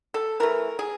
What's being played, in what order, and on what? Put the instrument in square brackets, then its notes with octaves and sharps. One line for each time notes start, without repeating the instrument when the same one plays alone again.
[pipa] A4
E3 A3 A#4
G#4